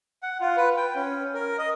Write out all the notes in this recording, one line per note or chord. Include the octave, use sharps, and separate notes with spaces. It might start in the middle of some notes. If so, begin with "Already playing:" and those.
F#5
F4
B4
G5
C#4
A#4
D#5